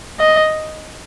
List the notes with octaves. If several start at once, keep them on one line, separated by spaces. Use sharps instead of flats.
D#5